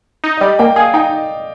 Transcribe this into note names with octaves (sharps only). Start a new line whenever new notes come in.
D#4
D#5
G3 D5
A#3 G5
G#4 F5
D#4 G5